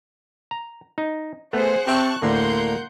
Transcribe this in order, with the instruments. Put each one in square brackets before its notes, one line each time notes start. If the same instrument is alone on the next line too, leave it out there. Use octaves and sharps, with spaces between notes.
[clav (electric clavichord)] A#5
D#4
[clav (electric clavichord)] A3 B3 [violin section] G#4 C5 F#5
[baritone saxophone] C4 [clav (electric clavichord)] G4 E5 [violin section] A5 C#6 F#6
[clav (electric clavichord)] D2 A2 D3 [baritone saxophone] A#3 [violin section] F#5 C6 G6